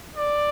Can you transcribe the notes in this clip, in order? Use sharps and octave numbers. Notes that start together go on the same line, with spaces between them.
D5